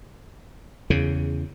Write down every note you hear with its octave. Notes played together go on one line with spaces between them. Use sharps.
E2 C#3